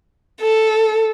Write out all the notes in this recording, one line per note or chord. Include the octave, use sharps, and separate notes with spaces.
A4